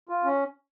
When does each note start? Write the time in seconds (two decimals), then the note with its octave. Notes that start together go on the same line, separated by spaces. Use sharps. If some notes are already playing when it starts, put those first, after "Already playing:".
0.09 F4
0.24 C#4